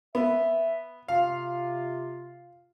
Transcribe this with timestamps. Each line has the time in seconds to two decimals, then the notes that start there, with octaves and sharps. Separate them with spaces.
0.15 B3 E5
1.08 C3 F4 F5